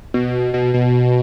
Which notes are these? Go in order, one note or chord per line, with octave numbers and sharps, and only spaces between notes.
B2
B2
B2